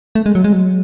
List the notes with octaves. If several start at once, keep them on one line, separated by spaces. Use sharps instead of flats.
A3
G#3
F#3
G#3
F#3